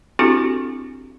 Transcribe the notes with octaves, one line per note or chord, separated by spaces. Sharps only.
C4 D4 E4 F#4 G4 A4